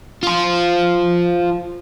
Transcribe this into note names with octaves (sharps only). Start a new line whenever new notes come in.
F4 C5